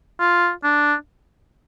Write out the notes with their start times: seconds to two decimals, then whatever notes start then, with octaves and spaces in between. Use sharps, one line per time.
0.20 F4
0.63 D4